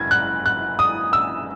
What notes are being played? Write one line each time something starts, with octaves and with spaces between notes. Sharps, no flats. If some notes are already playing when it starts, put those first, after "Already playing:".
Already playing: F#1 G#6
F#6
F#6
D#6
E6